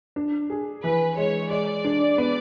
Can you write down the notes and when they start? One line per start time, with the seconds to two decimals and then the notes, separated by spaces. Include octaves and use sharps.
0.16 D4
0.50 G#4
0.83 E3 B4
1.17 G#3 C#5
1.50 G#3 D5
1.85 D4
2.18 B3